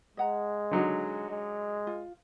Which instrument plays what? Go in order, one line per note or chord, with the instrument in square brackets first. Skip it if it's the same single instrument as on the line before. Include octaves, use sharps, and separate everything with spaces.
[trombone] G#3 [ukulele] D#5 F#5 A#5
[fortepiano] D3 F#3 D#4
[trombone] G#3
[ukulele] F4